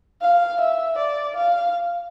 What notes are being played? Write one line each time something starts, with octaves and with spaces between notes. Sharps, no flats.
F5
E5
D5
F5